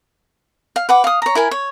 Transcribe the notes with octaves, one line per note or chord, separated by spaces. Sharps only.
F5
B4 F#5 D6
F5 D#6
C#5 A#5
E4 A#4 G#5
C#5